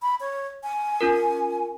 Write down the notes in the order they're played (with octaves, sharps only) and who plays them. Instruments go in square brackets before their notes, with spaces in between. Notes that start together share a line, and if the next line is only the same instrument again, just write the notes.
[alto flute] B5
C#5
G#5
[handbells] C#4 F4 A#4